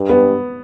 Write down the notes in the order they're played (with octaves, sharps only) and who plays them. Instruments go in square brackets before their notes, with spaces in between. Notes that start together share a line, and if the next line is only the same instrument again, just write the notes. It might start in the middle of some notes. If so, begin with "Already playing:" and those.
Already playing: [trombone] G2
[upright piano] B3